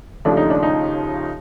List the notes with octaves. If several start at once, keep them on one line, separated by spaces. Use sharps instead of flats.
D#2 C#3 F3 A3 D4
D#4
D4
D#4